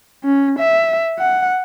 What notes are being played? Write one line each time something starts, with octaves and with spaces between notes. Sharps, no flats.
C#4
E5
F#5